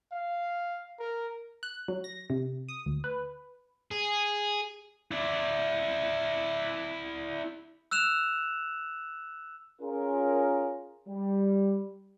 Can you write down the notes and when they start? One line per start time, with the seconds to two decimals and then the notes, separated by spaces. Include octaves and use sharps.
0.12 F5
0.99 A#4
1.63 F#6
1.88 F#3
2.04 A#6
2.30 C3
2.69 D#6
2.86 D2
3.04 B4
3.91 G#4
5.11 E4 D5
7.91 E6 F#6 E7 F7
9.81 C#4 F4 G#4 A#4
11.08 G3